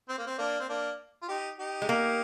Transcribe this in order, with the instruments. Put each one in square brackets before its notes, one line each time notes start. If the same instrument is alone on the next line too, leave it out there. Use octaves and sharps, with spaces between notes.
[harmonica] C4
A#3
C4
A#3 D4
C4
A#3 D4
F4
D#4 G4
D#4 G4
[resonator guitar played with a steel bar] G#3
A#3